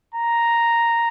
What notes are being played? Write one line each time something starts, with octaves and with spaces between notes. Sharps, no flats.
A#5